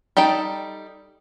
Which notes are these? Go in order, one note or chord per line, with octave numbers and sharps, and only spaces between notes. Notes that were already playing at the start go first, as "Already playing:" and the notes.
G3 D#4 A4 G5